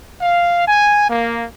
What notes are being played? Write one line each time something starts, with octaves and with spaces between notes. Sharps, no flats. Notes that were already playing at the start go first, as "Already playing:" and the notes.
F5
G#5
A#3